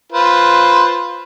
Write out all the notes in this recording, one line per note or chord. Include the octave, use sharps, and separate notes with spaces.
F4 B4 C5